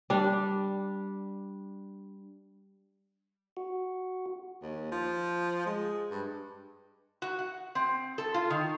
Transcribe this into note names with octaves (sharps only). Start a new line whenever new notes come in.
G3 D4
F#4
D#2
F3
G#3
G2
F#4
F#5
C4
A4
F4
D#3